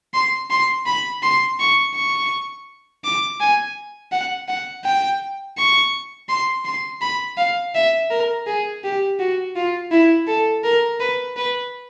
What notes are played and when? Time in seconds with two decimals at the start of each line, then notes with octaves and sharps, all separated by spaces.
0.14 C6
0.50 C6
0.86 B5
1.22 C6
1.59 C#6
1.95 C#6
3.04 D6
3.40 G#5
4.12 F#5
4.48 F#5
4.84 G5
5.58 C#6
6.29 C6
6.65 C6
7.01 B5
7.37 F5
7.75 E5
8.10 A#4
8.47 G#4
8.83 G4
9.19 F#4
9.56 F4
9.91 E4
10.27 A4
10.64 A#4
11.00 B4
11.37 B4